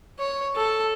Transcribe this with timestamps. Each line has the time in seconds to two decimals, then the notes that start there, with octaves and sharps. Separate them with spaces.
0.19 C#5
0.56 A4